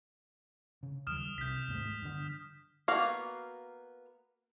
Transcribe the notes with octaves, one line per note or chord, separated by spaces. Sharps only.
C#3
D#2 G3 D#6 F6 E7
C2 C3 G6 B6
D#2 G#2 A3
G2 D3
A#3 B3 F#4 F5